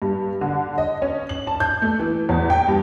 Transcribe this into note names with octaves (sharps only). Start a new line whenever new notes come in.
G2
D3
D#5
C#4
F#7
A5
G6
A3
E3
E2
G5
G2